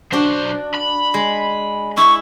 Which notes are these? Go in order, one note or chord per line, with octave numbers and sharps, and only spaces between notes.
B1 D4 F#4 C5
B5
G#3
E4 C#6